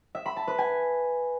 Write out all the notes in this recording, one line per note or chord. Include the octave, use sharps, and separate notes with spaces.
E5
B5
A5
B4
G#5